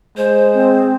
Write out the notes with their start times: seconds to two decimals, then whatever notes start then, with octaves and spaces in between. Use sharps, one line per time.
0.17 G#3 C5
0.54 C4 G#4